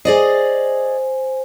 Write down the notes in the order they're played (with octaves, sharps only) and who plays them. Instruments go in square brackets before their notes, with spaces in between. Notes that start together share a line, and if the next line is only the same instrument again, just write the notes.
[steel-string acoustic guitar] G#4 D5 D#5 [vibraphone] C5 G#5